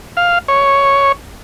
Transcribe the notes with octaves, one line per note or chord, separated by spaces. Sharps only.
F5
C#5